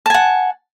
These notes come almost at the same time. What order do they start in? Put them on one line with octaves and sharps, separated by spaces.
A5 G#5 F#5